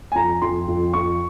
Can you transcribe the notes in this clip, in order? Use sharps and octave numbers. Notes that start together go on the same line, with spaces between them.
G#5
F2 A#5
F2 C6
F2
F2 C#6